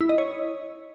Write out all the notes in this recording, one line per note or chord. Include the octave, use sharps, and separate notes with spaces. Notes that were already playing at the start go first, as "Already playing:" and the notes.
E4
D#5
C#5